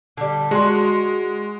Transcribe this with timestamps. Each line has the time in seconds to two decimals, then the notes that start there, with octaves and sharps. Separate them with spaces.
0.17 D3 G3
0.51 G#3 F#4 G#5 C6